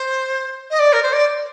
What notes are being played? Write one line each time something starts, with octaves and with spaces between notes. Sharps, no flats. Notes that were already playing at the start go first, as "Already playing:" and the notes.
Already playing: C5
D#5
D5
A#4
C5
D5